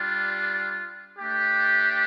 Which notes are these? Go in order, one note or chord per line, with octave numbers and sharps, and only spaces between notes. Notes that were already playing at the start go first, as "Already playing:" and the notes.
Already playing: G3 D4 F4
A3 D4 G4